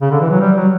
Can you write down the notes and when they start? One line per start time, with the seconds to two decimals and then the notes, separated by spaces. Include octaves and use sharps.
0.02 C#3
0.11 D3
0.20 E3
0.30 F#3
0.40 G3
0.57 F#3